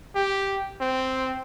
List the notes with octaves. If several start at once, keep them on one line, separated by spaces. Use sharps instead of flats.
G4
C4